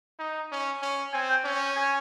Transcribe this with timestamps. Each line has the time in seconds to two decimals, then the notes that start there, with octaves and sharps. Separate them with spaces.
0.19 D#4
0.51 C#4
0.82 C#4
1.13 C4 G#5
1.29 G5
1.44 C#4
1.76 G#5